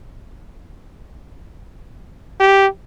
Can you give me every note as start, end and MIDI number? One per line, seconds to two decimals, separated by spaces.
2.40 2.67 67